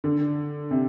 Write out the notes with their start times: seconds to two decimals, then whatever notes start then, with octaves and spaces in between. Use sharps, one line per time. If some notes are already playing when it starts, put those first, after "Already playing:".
0.04 D3
0.71 C3